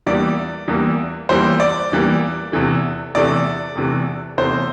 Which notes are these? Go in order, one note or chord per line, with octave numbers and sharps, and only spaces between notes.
E2 E3 G3 A#3 D5
E2 E3 G3 A#3
E2 E3 G3 A#3 C5
D5
E2 E3 G3 A#3
E2 C3 E3 A3
E2 C3 E3 A3 D5
E2 C3 E3 A3
E2 C3 E3 A3 C5